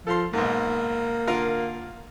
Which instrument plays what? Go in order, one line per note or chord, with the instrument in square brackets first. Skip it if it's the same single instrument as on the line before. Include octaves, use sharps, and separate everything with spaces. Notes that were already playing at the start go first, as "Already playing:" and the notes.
[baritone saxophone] F3 [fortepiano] A4 C6
[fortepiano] B1 G#2 [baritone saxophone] A#3
[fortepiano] D3 F4 A#4